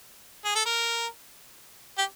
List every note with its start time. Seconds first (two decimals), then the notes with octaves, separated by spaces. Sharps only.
0.45 G#4
0.55 A4
0.65 A#4
1.98 G4